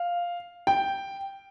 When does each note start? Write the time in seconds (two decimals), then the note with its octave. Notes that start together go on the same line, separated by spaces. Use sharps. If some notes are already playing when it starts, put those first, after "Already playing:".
Already playing: F5
0.67 G5